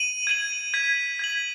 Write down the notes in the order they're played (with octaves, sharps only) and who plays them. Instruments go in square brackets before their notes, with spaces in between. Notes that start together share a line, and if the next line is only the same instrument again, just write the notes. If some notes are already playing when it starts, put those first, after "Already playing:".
Already playing: [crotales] D#7 F#7
G#6 D#7 F#7
G#6 B6 F#7
G#6 B6 F#7